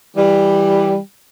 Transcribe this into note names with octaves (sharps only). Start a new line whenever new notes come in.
E3 G3